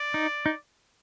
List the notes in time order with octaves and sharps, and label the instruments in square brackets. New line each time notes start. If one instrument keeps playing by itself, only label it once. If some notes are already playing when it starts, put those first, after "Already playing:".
Already playing: [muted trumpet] D5
[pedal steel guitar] D#4
D#4